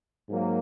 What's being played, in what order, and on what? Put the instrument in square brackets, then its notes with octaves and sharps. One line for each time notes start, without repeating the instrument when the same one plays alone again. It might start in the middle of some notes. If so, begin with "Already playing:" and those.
[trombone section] G#2 F#3 A#3